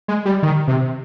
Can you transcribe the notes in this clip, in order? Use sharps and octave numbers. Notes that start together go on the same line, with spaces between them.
G#3
G3
D#3
C3